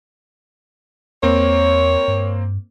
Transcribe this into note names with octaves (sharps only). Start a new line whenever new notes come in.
E2 A#3 C4 C#5
G2